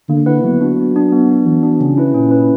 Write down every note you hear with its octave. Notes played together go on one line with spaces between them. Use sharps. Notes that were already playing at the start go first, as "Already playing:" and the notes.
D3 A#3
E4 B4 F#5
F#3 B3
D4 F#4
B3
D4 F#4
B3
D4 F#4
E3 B3
D4 F#4
C#3 C#4
E4 B4
A#2 C#4
E4 B4